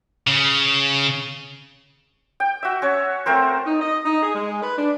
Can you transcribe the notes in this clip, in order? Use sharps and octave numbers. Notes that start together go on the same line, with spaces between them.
C#3
G5
F#4 E5
C#4 C#5
A3 C4 A#4 C5
D#4
D#5
D#4
G#4
G#3
B4
D4